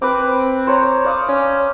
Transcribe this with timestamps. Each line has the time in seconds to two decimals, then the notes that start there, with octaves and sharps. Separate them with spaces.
0.02 C4 B4 D6
0.67 C5 C#5 A#5
1.05 D5 F5 D#6
1.29 C#4